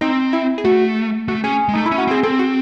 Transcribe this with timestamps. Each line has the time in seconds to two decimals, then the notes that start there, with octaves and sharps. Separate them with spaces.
0.01 C4 D#4
0.33 E4
0.58 G#4
0.65 A3 F#4
1.28 A3 F#4
1.44 C#4 G#4
1.68 G#3
1.74 A3 D#4
1.86 E4
1.91 C#4
1.98 F#4
2.07 C4 G#4
2.23 C4 A4
2.39 F#4